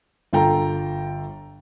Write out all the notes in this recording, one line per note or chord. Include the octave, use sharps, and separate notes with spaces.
G1 F4 A4 G5 A#5